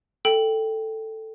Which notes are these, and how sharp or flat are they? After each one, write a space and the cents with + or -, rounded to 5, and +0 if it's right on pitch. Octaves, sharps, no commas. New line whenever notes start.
A4 +5 G5 +0